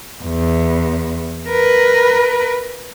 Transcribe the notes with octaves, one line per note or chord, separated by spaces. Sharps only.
E2
A#4 B4